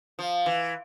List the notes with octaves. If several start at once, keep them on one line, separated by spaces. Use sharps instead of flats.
F3
E3